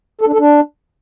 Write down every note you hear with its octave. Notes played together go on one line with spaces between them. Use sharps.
A4
D4
A4
D4